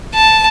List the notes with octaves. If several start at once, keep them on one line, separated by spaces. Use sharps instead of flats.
A5